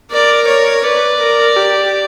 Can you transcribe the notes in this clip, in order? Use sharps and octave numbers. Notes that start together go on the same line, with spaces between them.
A#4 D5
C#5
B4 D5
A#4
G4